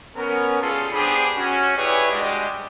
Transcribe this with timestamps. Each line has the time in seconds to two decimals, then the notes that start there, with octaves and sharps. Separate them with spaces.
0.17 B3 C#4 A#4
0.61 G3 C#4 F4 G#4 A4
0.92 B3 D4 G4 G#4 C5 B5
1.37 C#4 F#4
1.77 E4 G4 G#4 B4 C#5 D5
2.11 G3 G#3 D4 F#4 G4 D#5